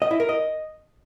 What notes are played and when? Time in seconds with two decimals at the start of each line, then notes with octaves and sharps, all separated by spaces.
0.02 D#5
0.11 E4
0.20 A#4
0.29 D#5